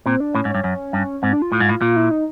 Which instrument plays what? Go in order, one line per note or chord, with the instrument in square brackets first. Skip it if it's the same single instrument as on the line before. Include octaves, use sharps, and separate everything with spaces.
[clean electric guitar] A#2 [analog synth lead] C4
[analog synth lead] D4
[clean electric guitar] A2 [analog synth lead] C#4
[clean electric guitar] G#2
[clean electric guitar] G2 [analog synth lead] C#4
[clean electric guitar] F#2
G2
[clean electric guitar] G#2 [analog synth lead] C4
[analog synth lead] D4
F4
[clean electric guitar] A2
G#2
A2
[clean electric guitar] A#2 [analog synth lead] F4
[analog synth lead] E4
D#4